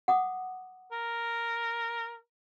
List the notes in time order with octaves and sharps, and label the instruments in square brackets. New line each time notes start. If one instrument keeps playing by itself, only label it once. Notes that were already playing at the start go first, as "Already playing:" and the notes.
[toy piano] F#5 D6 D#6
[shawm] A#4